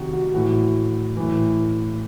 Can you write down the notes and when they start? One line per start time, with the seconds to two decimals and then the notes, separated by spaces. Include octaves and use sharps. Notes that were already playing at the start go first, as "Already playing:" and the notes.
Already playing: C3 D#3 F#4 G4
0.13 F#4
0.34 A2 E3 F#4
1.17 A2 E3